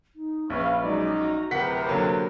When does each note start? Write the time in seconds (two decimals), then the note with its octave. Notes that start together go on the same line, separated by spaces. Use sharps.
0.16 D#4
0.50 A#1 C#4 B4 F5 C#6
0.81 F#3 G#3 C#4 D#4 D5
1.19 F#4 A#5
1.51 D1 C3 A#4 B4 F#5 G5 A#5 B6
1.87 D3 F#3 A#3